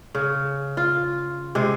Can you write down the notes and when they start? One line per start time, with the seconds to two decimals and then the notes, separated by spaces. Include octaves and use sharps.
0.15 C#3
0.77 F4
1.55 C3 G#3